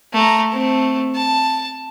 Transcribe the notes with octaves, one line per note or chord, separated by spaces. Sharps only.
A3 A#5
A3 C4
A5